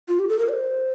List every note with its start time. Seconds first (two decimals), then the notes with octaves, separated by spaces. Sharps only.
0.08 F4
0.19 G4
0.29 A4
0.39 A#4
0.49 D5
0.53 C5